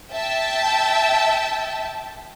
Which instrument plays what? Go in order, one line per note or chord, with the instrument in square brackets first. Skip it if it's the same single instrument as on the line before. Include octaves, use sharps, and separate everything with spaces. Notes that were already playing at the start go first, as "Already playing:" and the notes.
[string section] E5 G5 A5